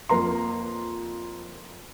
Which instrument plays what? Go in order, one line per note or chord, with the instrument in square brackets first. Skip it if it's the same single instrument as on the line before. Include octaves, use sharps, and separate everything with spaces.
[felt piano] F2 A#3 B4 A#5 C6